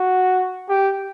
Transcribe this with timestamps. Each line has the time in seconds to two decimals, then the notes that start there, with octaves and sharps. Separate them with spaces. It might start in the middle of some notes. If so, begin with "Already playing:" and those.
Already playing: F#4
0.69 G4